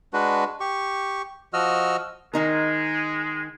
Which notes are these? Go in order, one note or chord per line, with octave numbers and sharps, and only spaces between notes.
G#3 D4 F#4 B4
G4 C#6
F3 F#4 D#5 E6 F6
D#3 G#3 D#4 A#4